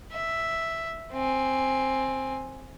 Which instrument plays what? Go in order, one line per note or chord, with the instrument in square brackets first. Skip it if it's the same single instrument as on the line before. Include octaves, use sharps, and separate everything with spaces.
[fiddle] E5
C4 G#5